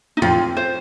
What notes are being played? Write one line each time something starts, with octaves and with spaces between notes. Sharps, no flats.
D#4
F2 F4
C5